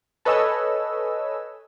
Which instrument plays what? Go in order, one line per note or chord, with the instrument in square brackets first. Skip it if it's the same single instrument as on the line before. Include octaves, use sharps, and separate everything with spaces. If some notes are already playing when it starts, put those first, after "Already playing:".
[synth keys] A4 B4 C#5 D#5 G#5 E6